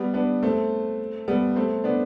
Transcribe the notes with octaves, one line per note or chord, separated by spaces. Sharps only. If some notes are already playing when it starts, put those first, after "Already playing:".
Already playing: G3 B3
B3 D4
A3 C4
G3 B3
A3 C4
B3 D4